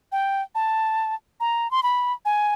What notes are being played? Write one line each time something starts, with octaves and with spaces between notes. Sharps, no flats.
G5
A5
A#5
C6
B5
G#5